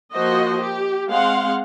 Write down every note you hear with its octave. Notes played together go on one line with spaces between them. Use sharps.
F3 A#3 F#4 C5 D#5
G4
G#3 C4 F5 F#5 C6